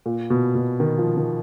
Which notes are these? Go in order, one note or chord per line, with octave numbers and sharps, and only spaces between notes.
A#2
B2
B2
D#3
F3
D#3